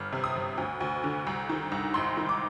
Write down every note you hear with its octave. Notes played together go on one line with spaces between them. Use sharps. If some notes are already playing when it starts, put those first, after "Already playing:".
Already playing: G1 F6
C3
D#6
G1
D2
D2
D3
C2
D#3
C2
G#1 C6
D#3
D6